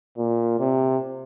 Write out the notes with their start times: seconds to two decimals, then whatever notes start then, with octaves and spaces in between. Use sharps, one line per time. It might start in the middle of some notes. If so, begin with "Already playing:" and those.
0.18 A#2
0.60 C3